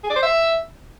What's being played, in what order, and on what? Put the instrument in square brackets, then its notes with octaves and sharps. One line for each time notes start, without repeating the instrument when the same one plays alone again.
[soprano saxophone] G#4
D5
C5
E5